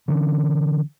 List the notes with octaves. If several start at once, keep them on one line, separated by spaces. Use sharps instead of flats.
D3 E3 A3 C#4